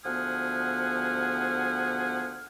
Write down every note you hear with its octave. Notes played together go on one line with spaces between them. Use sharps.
D2 F3 B3 G#4 F#5 F6